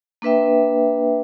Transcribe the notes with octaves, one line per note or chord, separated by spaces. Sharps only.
A#3 D4 B4 E5 G5